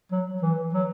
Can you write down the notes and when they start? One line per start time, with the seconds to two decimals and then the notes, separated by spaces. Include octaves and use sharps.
0.12 F#3
0.42 E3
0.74 F#3